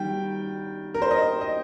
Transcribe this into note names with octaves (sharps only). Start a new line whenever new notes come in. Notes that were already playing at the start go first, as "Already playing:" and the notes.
Already playing: D#3 G3 G5
A#4
C5
D#5
D#5